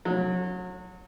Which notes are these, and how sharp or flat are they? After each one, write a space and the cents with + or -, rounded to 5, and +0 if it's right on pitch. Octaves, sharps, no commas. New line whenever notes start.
F#3 -25 C#4 +10